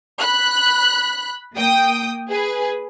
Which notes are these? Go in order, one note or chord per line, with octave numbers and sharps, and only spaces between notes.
B5 F#6
A#3 G5 D#6
G#4 B4